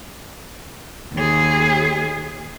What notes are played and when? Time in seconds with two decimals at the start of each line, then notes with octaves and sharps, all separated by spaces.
1.14 D#2 G#4